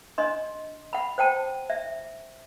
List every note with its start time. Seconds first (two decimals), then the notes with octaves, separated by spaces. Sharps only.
0.18 D4 D#5 C6
0.93 F#5 B5
1.18 C5 F#5 G5 A5
1.70 E5